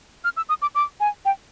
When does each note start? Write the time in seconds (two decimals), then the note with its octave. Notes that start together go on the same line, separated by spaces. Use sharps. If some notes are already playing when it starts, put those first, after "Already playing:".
0.24 F6
0.37 E6
0.49 D#6
0.62 D6
0.75 D6
1.00 G#5
1.25 G5